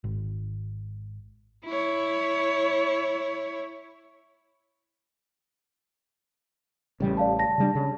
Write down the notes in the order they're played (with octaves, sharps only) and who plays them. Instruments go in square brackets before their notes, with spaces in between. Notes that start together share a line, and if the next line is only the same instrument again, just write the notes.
[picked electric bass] G#1
[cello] E4 C#5
[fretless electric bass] A1 C#3 G3
[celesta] D5 F5 A5
A5 A#6
[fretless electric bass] C#3 G3 D4
C#3